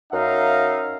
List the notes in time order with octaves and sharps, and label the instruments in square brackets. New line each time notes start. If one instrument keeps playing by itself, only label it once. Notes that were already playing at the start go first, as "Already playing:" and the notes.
[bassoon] F#2 [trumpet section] D#4 E5 F5